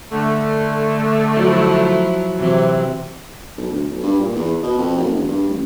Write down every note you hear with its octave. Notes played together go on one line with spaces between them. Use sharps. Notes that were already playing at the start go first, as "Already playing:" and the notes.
D3 A3
F3 F#3 E4
C3 E3 F#3 C4
B1
D2
B1
G2
A#2
E2
B2
F2
F#1
E1
G2
A1